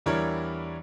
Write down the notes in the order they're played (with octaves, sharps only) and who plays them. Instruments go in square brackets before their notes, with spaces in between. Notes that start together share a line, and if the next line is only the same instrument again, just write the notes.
[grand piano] E2 G3 D4 E4 A#4 C#5